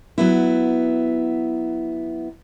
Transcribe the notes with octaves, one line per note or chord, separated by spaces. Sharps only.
F#3 B3 E4